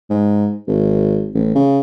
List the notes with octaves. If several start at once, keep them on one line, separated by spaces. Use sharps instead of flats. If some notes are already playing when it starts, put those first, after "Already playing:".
G#2
G#1
A1
C#3